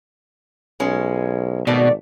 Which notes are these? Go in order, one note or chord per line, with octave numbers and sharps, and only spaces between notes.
B1 G#3 C#4
G#1 B2 A3 D5